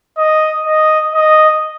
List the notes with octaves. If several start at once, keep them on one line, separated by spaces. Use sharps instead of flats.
D#5
D#5
D#5